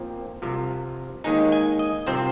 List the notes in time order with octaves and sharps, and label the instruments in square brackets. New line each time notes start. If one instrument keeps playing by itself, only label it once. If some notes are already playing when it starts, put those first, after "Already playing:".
Already playing: [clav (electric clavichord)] A#2 F3 C4
C2 C3 F3
D#2 D#3 G#3 D#4 G#5
G#5
D#5
C2 C3 F3 C4 C5